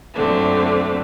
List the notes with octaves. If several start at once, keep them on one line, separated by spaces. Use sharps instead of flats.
F#2 A#2 D3 A3 C4